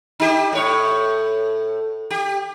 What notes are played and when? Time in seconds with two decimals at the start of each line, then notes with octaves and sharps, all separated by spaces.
0.20 D#4 G4
0.53 A2 C#5
2.10 G4